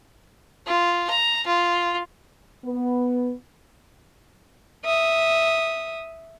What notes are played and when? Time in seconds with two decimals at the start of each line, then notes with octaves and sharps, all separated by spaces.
0.67 F4
1.10 A#5
1.46 F4
2.65 B3
4.85 E5 D#6